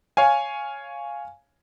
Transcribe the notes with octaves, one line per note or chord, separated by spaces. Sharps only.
C#5 F5 G#5